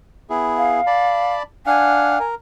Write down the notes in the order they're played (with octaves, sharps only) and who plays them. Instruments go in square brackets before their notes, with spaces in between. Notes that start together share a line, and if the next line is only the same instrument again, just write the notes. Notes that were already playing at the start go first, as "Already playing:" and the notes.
[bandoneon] B3 E4 G#4
[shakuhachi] F5
[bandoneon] D5 A5 B5
[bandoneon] D4 F5 F#5 [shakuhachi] G#5
[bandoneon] A#4